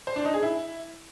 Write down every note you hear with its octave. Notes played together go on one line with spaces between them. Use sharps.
C5
D4
D#4
G#4
E4